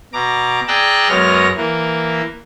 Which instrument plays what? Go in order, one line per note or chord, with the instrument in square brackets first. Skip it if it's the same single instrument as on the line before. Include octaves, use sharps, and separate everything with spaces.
[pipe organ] B2 A#5 D6
G#4 D5 G5 A#5 E6 F#6
F#2 G#3 B3 C#5 F6 A#6
E3 A#3